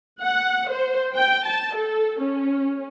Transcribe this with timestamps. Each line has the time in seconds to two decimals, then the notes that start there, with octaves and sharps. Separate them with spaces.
0.21 F#5
0.71 C5
1.15 G5
1.45 A5
1.75 A4
2.19 C#4